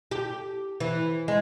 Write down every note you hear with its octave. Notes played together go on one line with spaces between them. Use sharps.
G4
E3
G#3